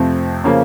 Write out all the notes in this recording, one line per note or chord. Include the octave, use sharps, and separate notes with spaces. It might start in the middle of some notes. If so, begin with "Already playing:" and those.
Already playing: F2 C3 F3 A3 C4
C#3 F3 A#3 C#4